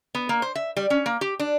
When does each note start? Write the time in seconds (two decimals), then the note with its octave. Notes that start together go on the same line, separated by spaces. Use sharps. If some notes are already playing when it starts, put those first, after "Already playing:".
0.15 B3
0.29 A#3
0.42 C5
0.55 E5
0.77 G3
0.90 C#4
1.06 A#3
1.21 G4
1.40 D4